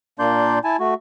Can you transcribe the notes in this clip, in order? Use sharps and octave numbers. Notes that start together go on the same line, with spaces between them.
A#2 A#3 D4 D5 C6 G6
E4 G#5 A5
A3 F#4